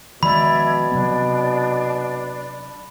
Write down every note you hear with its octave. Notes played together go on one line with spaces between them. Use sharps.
B2 D#3 F3 G#3 D5 E5 B5 G#6
C3 F#3 B3 D4